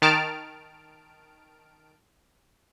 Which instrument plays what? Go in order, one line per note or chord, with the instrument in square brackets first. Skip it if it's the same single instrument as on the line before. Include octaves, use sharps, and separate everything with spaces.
[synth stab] D#3 A5 F6 D7